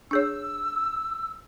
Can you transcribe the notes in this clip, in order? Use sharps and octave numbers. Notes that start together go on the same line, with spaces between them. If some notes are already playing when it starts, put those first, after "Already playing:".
D4 G#4 C#5 E6